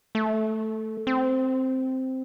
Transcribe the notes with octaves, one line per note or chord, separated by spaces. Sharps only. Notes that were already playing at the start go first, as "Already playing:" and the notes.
A3
C4